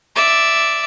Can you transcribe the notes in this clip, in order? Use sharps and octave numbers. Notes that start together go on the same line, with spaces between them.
D5 E5